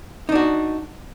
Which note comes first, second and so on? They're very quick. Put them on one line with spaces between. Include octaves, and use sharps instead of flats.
D#4 D4 F#4